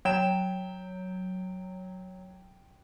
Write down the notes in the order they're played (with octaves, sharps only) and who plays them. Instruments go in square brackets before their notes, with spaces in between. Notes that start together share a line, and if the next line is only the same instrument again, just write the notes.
[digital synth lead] F#3 [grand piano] G5 E7